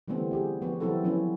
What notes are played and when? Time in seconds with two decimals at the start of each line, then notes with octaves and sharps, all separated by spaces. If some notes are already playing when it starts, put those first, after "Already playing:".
0.08 D3 E3 G3 A3 B3 C4
0.31 G3 G4 G#4
0.61 F3 B3 F#4
0.80 E3 F#3 B3 C4 E4 A4
1.04 F3 F#3 B3 C#4 E4